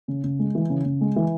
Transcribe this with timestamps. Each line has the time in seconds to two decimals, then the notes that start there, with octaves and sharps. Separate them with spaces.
0.08 C#3
0.24 C#3
0.39 G#3
0.55 E3
0.70 C#3
0.85 C#3
1.01 G#3
1.16 E3